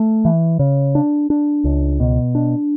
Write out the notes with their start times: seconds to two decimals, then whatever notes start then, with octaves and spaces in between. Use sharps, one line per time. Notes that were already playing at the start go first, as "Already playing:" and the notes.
Already playing: A3
0.25 E3
0.59 C#3
0.95 D4
1.30 D4
1.64 C#2
2.00 B2
2.35 D4